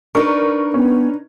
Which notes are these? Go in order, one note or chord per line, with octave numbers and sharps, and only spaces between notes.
D4 D#4 A#4 B4 C#6
B3 C#4